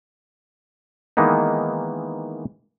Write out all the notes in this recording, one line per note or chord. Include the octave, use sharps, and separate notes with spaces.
D#3 E3 G#3 A#3 B3 D#4